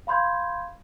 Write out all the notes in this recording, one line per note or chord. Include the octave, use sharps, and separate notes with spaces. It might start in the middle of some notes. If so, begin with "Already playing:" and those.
F5 B5 C6 G6 G#6